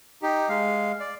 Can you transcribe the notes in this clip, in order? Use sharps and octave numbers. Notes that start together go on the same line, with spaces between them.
D#4 G4
G#3 F5
D5